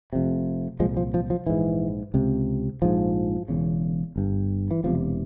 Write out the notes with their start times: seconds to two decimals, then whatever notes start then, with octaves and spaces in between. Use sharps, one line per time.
0.13 F1 F2 C3
0.80 C2 A#2 F3 G#3
0.97 F3
1.14 F3
1.30 F3
1.46 A#1 G#2 E3
2.14 C#2 C3
2.82 A#1 G#2 F3
3.48 E1 E2 C#3
4.16 G1 G2
4.71 E3
4.84 E1 E2 C3 F3